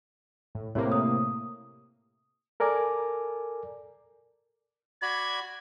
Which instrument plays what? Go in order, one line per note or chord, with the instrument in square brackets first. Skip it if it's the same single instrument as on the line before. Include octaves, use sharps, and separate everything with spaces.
[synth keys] A2
[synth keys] A2 C3 A#3 [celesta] C#5
[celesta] D#6
[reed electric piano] A4 A#4 D5 G#5 D6
[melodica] F#4 D5 B5 [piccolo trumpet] G#6